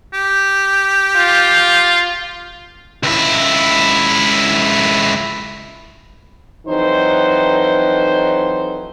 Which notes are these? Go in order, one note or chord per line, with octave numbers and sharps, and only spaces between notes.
G4
F4
C#2 E4
F2 E3 F#3 D#4 B4 C5